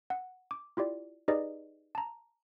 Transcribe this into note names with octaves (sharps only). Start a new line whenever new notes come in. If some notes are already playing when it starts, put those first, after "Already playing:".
F#5
D6
E4 F4 G4 D5
D#4 G4 G#4 B4 D5 D#5
A5 A#5